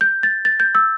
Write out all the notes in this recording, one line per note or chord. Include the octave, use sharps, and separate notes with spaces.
G6
A6
A6
G6
E6